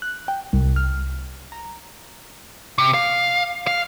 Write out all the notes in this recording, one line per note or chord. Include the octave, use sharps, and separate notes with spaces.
F#6
G5
C2
F6
A#5
C3
F5
F5